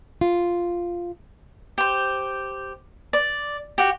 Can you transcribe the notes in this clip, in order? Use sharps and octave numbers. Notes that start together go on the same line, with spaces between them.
F4
G4 C5
D5
F#4 G4